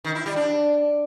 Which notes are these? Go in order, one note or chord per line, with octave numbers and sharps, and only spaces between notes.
D#3
E4
G3
D4